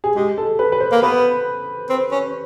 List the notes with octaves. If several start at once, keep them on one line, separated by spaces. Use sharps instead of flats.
G#4
G#3 G4
A4
B4
B4
C5
A#3
B3 B4
C4
C#4